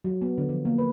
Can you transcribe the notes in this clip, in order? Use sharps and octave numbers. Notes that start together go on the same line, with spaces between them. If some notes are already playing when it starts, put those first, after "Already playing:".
F#3
B3
D3
F3
A#3
B4